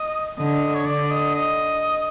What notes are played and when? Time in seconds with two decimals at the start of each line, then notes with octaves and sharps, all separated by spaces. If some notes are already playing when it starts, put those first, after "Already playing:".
Already playing: D#5
0.38 D3 D#5
0.75 C#5
0.86 D3 D5
1.11 D#5
1.34 D#5